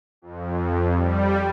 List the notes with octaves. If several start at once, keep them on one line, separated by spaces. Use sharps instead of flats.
F2
G3